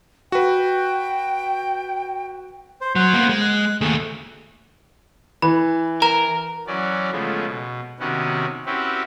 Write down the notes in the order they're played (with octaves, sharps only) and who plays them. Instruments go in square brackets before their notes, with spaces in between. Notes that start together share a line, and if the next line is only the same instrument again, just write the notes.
[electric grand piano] F#4 B4 [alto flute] G5
[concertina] C5
[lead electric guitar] F#3 [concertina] C5 F#5
[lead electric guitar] A#3 B3
G#3
[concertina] F#6
[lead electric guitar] D#2 A3 [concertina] G#4
[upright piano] E3 [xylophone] B5
[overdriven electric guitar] A#4 [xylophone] A#5
[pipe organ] E3 F#3 C#4 F#4 D5
C#3 F3 G#3 A3 B3
B2
C3 D#3 B3 C#4 F#4
C4 C#4 E4 F#4 G4 B4